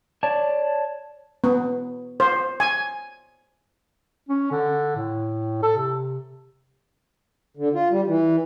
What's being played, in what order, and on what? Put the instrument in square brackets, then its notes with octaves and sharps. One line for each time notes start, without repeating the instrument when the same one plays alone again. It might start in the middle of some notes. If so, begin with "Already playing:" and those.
[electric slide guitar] C#5 D5 A5
[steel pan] B3
C5
G#5
[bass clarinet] C#4
D3
A2
A4
C3
[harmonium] D3
F4
G3
E3